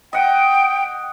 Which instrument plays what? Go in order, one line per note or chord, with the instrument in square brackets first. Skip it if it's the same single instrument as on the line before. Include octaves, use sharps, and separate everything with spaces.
[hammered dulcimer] D#5 F#5 [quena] G5